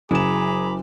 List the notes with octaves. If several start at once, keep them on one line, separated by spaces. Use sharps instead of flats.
F#1 F#3 E4 G#4 A#5 B5 D6 E7